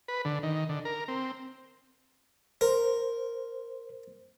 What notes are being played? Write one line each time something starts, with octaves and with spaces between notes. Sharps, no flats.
B4
D3
D#3
D3
A#4
C4
A#4 C5